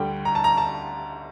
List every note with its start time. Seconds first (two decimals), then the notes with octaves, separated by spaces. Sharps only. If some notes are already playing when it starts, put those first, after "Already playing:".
Already playing: D2 D3 G3 G5
0.25 A#5
0.35 A5
0.44 A#5
0.57 A5